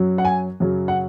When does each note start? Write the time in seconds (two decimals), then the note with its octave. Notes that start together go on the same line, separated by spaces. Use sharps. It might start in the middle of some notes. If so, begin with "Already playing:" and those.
Already playing: F#2 F#3
0.18 F#5
0.25 G#5
0.60 F#2 C#3 F#3
0.88 F#5